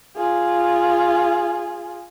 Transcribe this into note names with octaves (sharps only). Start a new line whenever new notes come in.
F4 G#4